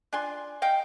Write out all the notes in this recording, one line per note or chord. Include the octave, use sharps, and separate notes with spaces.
D4 F4 G#5 C6
D#5 F5 G5